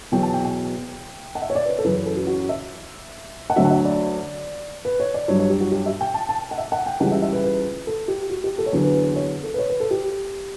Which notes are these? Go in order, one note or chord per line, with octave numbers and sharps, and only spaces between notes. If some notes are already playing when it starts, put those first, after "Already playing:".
E2 B2 F#3 G5
A5
G5
G5
F#5
E5
C#5
D5
B4
C#5
A4
F#2 C#3 E3 B4
B4
A4
F#4
F#4
E5
F#5
D2 D3 F#3 E5
F#5
E5
D5
B4
C#5
D5
G2 F#3 C#5
C#5
G4
F#4
G4
E5
G5
A5
A5
F#5
E5
F#5
G5
C#2 C#3 E3 G3 F#5
E5
E5
B4
B4
A4
G4
F#4
G4
A4
C#5
E2 D3 F#3 B4
B4
B4
C#5
A4
B4
C#5
B4
A4
G4